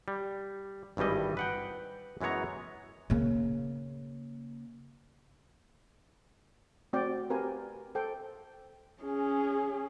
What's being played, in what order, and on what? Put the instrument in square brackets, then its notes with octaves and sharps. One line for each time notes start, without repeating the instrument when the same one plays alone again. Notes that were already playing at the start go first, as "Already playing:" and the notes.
[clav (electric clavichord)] G3
G#1 G2 E3 G3 D#5
B4 F#5 G5
F#2 E3 G#3 B3 C#5 A#5
[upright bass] C#3 A#3
[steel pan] A3 C4 F#4 D5 G5
C4 G4 A#4 B4 F5 G#5
A4 C5 G5
[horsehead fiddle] C#4 G#4